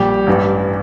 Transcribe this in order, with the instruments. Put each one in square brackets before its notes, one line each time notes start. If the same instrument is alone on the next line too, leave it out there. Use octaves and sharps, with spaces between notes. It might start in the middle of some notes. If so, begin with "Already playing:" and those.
Already playing: [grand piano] A#1 A#2 G3 G4
A1 G2 E3 G3